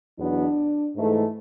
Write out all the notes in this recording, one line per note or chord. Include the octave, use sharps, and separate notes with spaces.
E2 B2 F#3 B3 D4
G#2 E3 A3